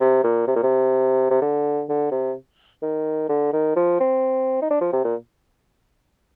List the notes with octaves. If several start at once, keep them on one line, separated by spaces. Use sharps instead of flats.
C3
A#2
C3
A#2
C3
C3
D3
D3
C3
D#3
D3
D#3
F3
C4
D#4
D4
F3
C3
A#2